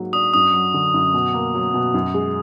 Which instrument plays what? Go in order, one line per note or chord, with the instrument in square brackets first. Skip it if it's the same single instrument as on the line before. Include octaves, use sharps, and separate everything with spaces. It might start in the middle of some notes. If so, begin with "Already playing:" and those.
Already playing: [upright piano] G#2 F#3 A#3
[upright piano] D4 [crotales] D#6
[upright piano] F#2 [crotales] D#6
[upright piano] F#3
D3
F#2
B2
A#3
F#3
B2
F#2
G#3